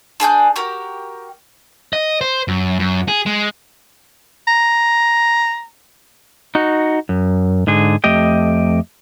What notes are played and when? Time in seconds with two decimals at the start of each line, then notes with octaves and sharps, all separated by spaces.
0.20 D4 G#4 G#5 G6
0.56 F#4 G4 A#4
1.93 D#5
2.21 C5
2.48 F#2
2.79 F#2
3.08 G#4
3.26 G#3
4.48 A#5
6.55 D#4 F#4
7.09 F#2
7.67 G#2 D3 G#4
8.04 F2 A3 G4 D#5 G5